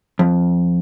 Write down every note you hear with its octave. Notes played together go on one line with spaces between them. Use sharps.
F2